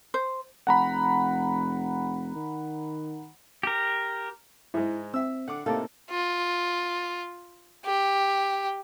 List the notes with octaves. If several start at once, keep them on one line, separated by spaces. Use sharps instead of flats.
C5
F1 F#5 A#5 B5
D#3
G4 A#4
G#2 G#3 E4
C4 E5 E6
D3 F#5 D6
A2 C3 A#3 D#4 A4 F5 A5 D6
F4
G4